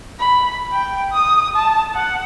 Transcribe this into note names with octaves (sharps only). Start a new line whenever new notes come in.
B5
G5
D#6
A5
F#5